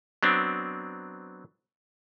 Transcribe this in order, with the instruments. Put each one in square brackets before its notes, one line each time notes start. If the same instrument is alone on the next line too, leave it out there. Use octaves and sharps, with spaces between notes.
[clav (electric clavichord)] F#3 B3 C4 D4